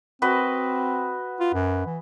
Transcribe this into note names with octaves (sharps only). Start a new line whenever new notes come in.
C4 F#4 B4 D#5
F4
F#2
E3